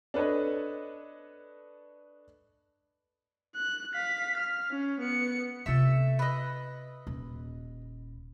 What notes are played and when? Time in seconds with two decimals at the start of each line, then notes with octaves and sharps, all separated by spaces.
0.14 D4 A4 B4 C#5 D#5
3.55 F#6
3.94 F5 B6
4.38 F6
4.71 C#4
5.00 B3 C#7
5.66 C3 A3 F4 E5
6.19 B4 D#5
7.07 D#1